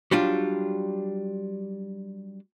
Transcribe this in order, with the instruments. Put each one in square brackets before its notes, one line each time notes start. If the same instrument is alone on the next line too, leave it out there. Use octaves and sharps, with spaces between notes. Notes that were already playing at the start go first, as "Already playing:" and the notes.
[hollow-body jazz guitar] F#3 G3 D4 F4